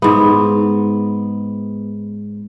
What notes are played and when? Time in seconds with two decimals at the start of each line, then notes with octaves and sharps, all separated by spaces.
0.02 G#2 B3